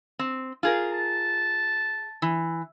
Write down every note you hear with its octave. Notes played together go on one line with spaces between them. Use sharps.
C4
F4 G#4 A#4
A5
E3